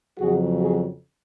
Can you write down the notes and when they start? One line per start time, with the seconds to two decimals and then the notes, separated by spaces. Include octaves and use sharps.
0.18 F2 C#3 F#3 F#4 G#4
0.60 F#4 G#4